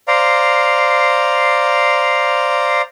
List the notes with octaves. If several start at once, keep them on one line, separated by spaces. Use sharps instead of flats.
C5 D5 F5 A#5